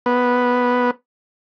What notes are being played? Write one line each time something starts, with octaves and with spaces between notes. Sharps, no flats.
B3